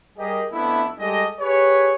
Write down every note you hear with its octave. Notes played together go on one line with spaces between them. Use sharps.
G3 G4 G#4 A#4 D#5
F2 A3 B3 D4 E4
G3 G#3 G4 A4 D#5
G4 G#4 B4 C#5